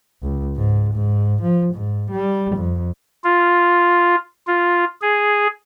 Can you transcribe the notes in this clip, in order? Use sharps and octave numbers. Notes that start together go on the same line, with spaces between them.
C#2
G#2
G#2
F3
G#2
G3
F2
F4
F4
G#4